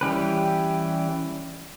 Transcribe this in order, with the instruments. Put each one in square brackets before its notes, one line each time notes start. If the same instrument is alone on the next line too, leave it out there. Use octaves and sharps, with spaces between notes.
[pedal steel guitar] E3 G3 C#4 G4 B4